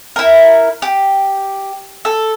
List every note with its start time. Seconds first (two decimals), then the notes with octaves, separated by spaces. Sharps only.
0.16 E4 A#4
0.82 G4
2.05 A4